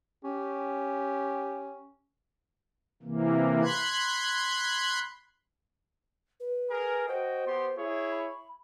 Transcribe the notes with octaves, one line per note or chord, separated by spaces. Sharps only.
C#4 G4
C3 E3 A#3
B5 C6 F#6 G#6
B4
G#4 A#4
F#4 C5 D#5 G5
B3 G4 C6
E4 G#4 C#5
B5